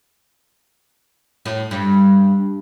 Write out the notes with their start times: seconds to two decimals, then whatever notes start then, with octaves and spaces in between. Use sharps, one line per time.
1.45 A2
1.71 G2